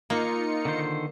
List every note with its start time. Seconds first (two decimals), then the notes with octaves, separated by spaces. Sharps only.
0.10 A#3 D#4 F4 C#7
0.65 D3 D#3 C5